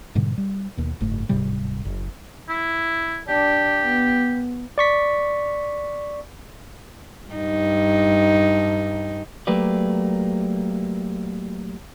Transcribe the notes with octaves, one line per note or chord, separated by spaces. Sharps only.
G#2 B2 D3 G3
G3
D#2 B2
F#1 G#2 A3
D1 G#2 C3 G3
F#1
E4
D4 G4
B3
D5 C#6 B6
G2 D#4
F#3 A3 A#3 G4 B4 D5